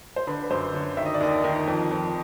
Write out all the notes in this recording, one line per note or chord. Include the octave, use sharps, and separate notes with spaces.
C5
D3 B4
B4
F#2 C5
D3 C#5
D#3 E5
D#5
D5
D#2 D#5
D#3
F2
F2